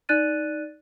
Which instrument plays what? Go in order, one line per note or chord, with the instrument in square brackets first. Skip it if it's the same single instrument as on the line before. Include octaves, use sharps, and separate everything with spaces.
[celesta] D#4 D5 F#6 A6 D#7